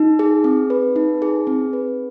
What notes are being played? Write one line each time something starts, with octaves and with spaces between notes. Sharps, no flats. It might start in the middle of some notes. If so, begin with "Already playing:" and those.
Already playing: D#4
G#4
C4
B4
D#4
G#4
C4
B4